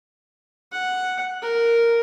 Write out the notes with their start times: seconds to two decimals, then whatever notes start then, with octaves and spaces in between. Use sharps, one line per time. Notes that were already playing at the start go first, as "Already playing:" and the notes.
0.72 F#5
1.42 A#4